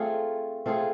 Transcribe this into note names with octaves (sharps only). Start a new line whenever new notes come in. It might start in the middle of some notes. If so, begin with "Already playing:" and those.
Already playing: A3 C4 F4 G#4
A3 C4 F4 G#4